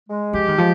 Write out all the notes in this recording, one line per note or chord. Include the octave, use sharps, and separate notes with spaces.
G#3
F3 G4
D#3
F3 G#3